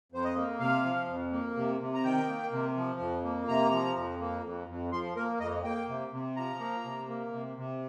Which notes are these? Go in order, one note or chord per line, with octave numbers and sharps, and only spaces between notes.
F2 C5
D#5
A#3
C3 F5
F3
F2
A#3
C3
C3
A#5
D#3 G5
A#3
C3
F3
F2
A#3
C3 A#5
F3
F2
A#3
F2
F2
F3 C6
A#3 A#4
F2 D#5
A#3 G5
C3
C3
F3 A#5
A#3
C3
A#3
C3
C3